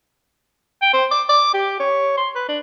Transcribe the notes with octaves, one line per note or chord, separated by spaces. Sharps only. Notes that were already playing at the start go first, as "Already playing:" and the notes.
G5
C5
D6
D6
G4
C#5
C6
B4
D4